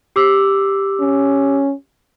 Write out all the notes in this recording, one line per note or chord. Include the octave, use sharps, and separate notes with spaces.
G4 D6 E6
C#4